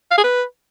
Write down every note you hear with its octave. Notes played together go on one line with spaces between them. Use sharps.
F5
G#4
B4